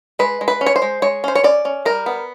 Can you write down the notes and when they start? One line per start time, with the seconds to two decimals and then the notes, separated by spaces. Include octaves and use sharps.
0.19 G#3 B4
0.41 G#3
0.48 B4
0.61 C#4
0.66 C#5
0.76 C5
0.82 G#3
1.02 G#3 C#5
1.24 C#4 C5
1.35 C#5
1.43 C#4 D5
1.65 C#4
1.85 G3 A#4
2.06 B3